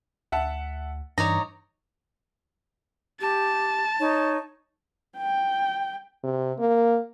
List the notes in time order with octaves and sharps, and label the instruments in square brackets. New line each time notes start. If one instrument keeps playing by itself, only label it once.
[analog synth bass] D2 [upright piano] E5 F#5 A5
[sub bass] G2 [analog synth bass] E3 [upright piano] D#4 [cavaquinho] C#5 D5 A#5
[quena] G4 [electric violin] A5
[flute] D#4 [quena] C#5
[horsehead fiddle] G5
[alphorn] C3
A#3